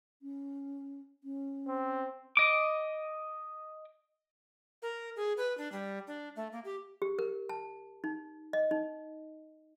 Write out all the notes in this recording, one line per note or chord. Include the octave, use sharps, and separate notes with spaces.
C#4
C#4
C4
D#5 D6
A#4
G#4
B4
D4
G3
D4
A3
A#3
G4
G4
A#4
A5
D#4
D#5
D#4